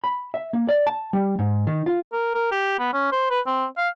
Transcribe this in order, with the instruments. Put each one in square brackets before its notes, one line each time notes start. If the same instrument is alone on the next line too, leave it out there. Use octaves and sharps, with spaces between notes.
[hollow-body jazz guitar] B5
E5
A#3
D5
A5
G3
G#2
D#3
F4
[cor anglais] A#4
A#4
G4
B3
C#4
C5
B4
C4
F5